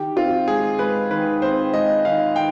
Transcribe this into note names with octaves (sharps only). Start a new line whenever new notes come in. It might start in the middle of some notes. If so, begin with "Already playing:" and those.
Already playing: D#3 G4
C4 F4
G#3 G#4
G#3 B4
D#3 B4
C4 C5
G#3 D#5
D#3 F5
D#3 G5